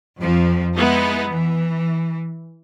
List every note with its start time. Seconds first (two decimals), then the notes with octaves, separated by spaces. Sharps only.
0.19 F2 F3
0.77 G#3 B3 D#4 E4
1.29 E3